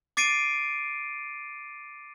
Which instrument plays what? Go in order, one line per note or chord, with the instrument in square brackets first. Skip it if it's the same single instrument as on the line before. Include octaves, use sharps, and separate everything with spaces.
[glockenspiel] D6 A6 C7 D7 D#7